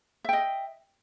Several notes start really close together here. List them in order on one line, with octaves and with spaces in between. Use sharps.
E5 G5 D#5